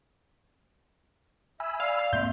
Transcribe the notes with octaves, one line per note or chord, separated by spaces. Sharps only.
E5 G#5 B5 E6
D5 F5
G#2 A#3 C4 E5 C6 G6